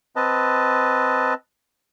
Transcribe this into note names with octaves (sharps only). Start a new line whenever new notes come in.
C4 B4 D#5 A5